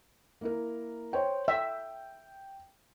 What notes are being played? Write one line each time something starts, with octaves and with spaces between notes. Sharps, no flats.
A#3 E4 A#4
C5 C#5 G5
E5 G5